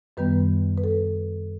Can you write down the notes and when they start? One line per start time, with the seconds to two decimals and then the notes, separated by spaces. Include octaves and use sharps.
0.17 F#2 D#3 G3 B3 B4
0.78 B4
0.84 A4